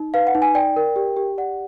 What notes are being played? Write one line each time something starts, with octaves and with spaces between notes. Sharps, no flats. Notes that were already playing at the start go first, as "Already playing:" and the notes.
Already playing: D#4
B4 F5
F#5
D#4
G#5
D5 G5
A#4
G4
G4
D5 F#5